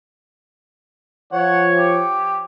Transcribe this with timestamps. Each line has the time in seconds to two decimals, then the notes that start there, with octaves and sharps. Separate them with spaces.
1.32 F3 C#5 F#5
1.77 G4